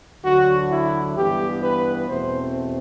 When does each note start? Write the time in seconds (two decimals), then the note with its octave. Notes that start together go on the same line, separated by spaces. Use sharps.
0.24 D2 D3 F#3 F#4
0.70 E4
1.16 G2 E3 B3 G4
1.63 B4
2.08 E2 B2 A3 C4 C5